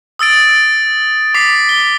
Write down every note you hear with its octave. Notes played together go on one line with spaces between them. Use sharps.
D#6 E6 A6 D7
D6 B6 C7
G7